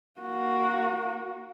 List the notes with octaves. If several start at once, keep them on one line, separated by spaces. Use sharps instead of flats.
A#3 F#4